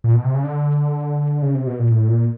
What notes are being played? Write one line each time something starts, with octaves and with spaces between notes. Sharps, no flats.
A#2
B2
C3
C#3
D3
C#3
C3
B2
A#2
A2
A#2